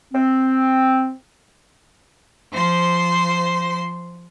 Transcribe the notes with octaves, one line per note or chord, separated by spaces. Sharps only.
C4
F3 C5 C6